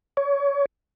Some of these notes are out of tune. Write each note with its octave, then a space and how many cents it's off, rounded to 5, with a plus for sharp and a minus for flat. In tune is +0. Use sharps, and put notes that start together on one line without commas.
C#5 +25